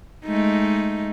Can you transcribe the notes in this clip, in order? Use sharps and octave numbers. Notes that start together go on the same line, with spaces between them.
G#3 A3 D#4